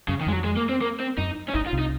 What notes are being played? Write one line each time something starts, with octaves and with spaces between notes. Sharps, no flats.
F#2 C#3
D#3
F2 G#3
F#3
G#3
A#3
C4
A#3
C4
F#2 D#4
C#4
G#1 G#2 D#4
F4
C2 C3
D#4